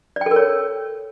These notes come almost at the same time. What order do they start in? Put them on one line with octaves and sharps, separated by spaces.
D5 G5 A4 A#4 C#5